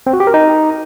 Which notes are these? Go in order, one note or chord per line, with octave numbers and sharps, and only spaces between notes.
C4
F#4
G4
A#4
D#4